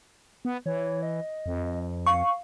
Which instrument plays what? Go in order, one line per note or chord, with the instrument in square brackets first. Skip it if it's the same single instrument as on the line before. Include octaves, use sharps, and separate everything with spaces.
[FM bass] B3
[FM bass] E3 [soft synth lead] C#5
[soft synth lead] D#5
[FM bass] F2
[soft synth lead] F5 [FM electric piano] C#6